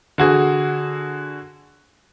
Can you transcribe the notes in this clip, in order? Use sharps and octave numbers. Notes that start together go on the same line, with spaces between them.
D3 F#4 G#4